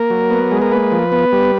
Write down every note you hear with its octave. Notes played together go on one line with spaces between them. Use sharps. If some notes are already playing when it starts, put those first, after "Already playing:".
Already playing: A#3 A#4
F#3
B3
G#3
A#4
A#3 B4
F3
B3
G3